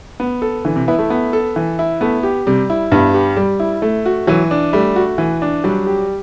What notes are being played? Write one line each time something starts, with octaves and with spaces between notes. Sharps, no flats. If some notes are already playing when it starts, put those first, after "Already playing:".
B3
A4
D3 E3
C3
B3 E4
A3
B3
A4
E3
E4
A3 B3
G4
C3 G3
E4
G2 B3
G4
G3
E4
A3
F#4
E3 F#3
D4
G3 A3
F#4
E3
D4
F#3 G3
G4